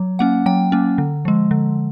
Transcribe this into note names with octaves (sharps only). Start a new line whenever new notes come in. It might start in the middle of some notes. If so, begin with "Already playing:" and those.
Already playing: F#3
A#3 C#4 F#5
F#3 G5
A#3 C#4
D3
F3 G#3
D3